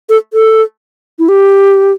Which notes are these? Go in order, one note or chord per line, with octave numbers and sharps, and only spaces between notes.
A4
A4
E4
G4